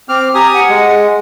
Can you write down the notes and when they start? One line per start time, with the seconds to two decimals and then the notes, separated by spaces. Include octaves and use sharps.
0.09 C4 D6 F6
0.35 G4 G#5 A#5 D#6
0.54 F#5
0.69 G#3